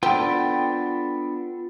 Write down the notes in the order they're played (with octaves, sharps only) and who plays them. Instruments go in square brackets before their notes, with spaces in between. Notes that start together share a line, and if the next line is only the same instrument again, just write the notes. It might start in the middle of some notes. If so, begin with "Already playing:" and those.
[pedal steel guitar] B3 D4 [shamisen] C4 [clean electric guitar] F4 A4 G5